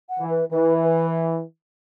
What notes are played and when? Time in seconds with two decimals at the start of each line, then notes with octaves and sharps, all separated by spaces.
0.09 F#5
0.20 E3
0.30 B4
0.51 E3 B4
0.84 B4